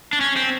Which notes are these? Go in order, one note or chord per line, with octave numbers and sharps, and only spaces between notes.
D4
C#4
C4